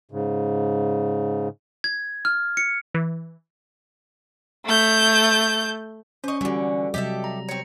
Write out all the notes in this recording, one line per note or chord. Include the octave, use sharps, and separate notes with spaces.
G#2 C#3
G#6
F6
C#7
E3
A3 G6
C#4 C5 D#5 C#6
D3 E3 G3 F#4
C3 F#3 G3 G4 A4 D#5 E5
A#5
C4 C#5 A#5 C#7